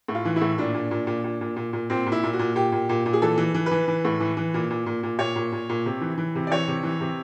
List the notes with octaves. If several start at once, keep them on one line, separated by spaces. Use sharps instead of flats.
A2
F4
E3
E4
A2
A#2 D4
A#2
A#2
A#2
A#2
A#2
A#2
A#2
A#2 C4
A#2
E4
A#2
F#4
A#2
A#2 G4
A#2
A#2
A#2
G#4
E3 A4
E3
E3
B4
E3
E3
A2
E3
E3
A#2
A#2
A#2
A#2
A#2 C#5
A#2
A#2
A#2
C3
E3
E3
C3
D5
E3 C#5
C3
E3
C3